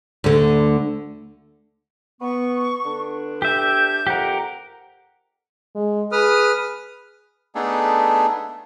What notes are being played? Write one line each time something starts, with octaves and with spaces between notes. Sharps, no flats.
D2 D3
B3 C#6
D3 B3 D4
G4 E5 G6
F2 G4 A#4 F#5
G#3
G#4 B4 D#6 F6
A3 B3 D4 D#4 G#4 A4